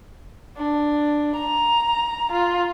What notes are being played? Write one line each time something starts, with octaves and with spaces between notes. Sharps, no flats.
D4
A#5
F4